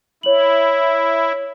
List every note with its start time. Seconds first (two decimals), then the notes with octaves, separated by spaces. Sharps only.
0.23 E4 C#5 F#7